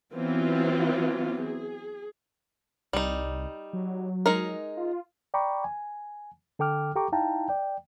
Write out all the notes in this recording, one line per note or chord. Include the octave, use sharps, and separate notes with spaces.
E3 F#3 B3 C4 F4
G#4
C2 G3 D#4
F#3
G#3 D#4 A#4
F4
D5 G5 A#5 B5 C#6 D6
G#5
D3 A4 G5 D6 F6
G4 A4 G5 A#5 C#6 D6
D#4 E4 F5 G5 A5 A#5
D5 G5